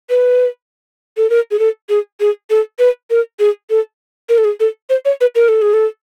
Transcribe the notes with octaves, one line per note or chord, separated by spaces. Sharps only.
B4
A4
A#4
G#4
A4
G#4
G#4
A4
B4
A#4
G#4
A4
A#4
A4
G#4
A4
C5
C#5
B4
A#4
A4
G#4
A4